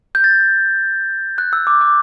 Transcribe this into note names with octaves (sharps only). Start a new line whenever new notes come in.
G6
A6
F#6
E6
D6
D6